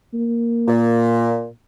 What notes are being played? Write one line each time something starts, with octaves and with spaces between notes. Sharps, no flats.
A#3
A#2